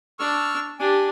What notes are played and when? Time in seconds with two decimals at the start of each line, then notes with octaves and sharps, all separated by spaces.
0.19 D4 C#6 E6 F6
0.79 D4 G4 G#5